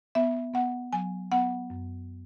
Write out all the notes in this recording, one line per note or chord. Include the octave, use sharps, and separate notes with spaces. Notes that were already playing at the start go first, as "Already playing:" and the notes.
B3 E5
B3 F#5
F#3 G#5
B3 F#5
F#2